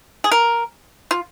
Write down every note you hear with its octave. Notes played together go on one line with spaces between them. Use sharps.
G#4
A#4
F4